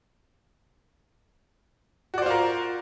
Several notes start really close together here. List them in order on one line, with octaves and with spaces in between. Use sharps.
F#4 D5 C5 F4 A#4